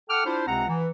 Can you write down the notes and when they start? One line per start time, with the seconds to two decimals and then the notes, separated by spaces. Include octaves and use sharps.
0.09 A4 F#5 G5 D6 F6
0.25 D4 E4 F4 C5
0.47 C#2 C3 C4 F#5 A#5
0.68 E3